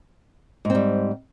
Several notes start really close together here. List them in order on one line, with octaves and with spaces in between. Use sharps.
G#2 C4 G3